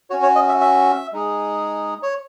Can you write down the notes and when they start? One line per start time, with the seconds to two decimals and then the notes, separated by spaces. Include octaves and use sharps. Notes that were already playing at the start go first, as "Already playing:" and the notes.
0.10 C#4 F#4 C#5
0.23 C#5
0.35 D#5
0.48 E5
0.61 E5
1.13 G#3 D#4 G#4
2.03 C#5